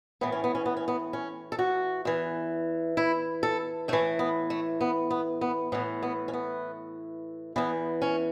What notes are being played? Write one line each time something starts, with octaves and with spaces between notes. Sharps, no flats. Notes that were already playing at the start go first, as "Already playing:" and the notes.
A2 E3 B3
C#4
B3
C#4
B3
C#4
B3
C#4
A4
F#4
E2 E3
E4
A4
A2 E3 A3
B3
A3
B3
B3
B3
A2 E3 B3
B3
C#4
B3
E2 E3 B3
C#4